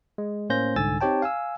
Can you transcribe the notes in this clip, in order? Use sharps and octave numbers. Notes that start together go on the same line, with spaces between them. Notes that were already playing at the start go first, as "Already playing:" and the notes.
G#3
A2 A#3 C#4 C5 G6 A#6
C2 G#2 D3 G#5 E6 A6
C4 D#4 G4 C#5 G5 A5
F5 G#5 E6